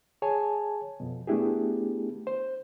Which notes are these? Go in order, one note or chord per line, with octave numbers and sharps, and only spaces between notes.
G#4 C#5 G#5 A5
F2 B2
A3 B3 D4 E4 G4 G#4
C5